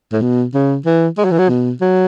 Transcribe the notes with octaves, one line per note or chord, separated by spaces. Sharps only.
A2
B2
C#3
E3
G#3
F#3
E3
F#3
B2
F#3